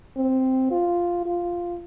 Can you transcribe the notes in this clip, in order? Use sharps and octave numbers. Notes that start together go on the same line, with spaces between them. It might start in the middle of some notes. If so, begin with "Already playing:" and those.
C4
F4
F4